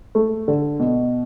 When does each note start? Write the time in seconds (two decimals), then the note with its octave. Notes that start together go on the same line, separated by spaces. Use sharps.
0.15 A3
0.48 D3
0.80 B2